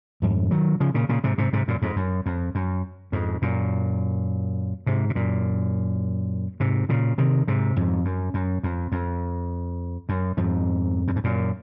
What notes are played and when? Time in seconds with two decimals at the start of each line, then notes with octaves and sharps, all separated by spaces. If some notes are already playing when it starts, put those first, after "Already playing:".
0.22 F2 G#2
0.51 D#3 F#3
0.80 C#3 F3
0.94 A#2 C#3
1.09 A#2 C#3
1.24 G#2 C3
1.38 G#2 C3
1.53 G#2 C3
1.68 F#2 A#2
1.82 F2 G#2
1.96 F#2
2.26 F2
2.55 F#2
3.12 F2 G#2
3.42 F#2 A#2
4.86 G#2 C3
5.10 C3
5.15 F#2 A#2
6.60 G#2 C3
6.89 A#2 C#3
7.18 C3 D#3
7.48 G#2 C3
7.76 F2 G#2
8.05 F#2
8.34 F#2
8.63 F2
8.92 F2
10.09 F#2
10.37 F2 G#2
11.08 F#2
11.16 G#2
11.24 F#2 A#2